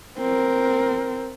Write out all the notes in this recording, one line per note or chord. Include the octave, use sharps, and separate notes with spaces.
C4 A#4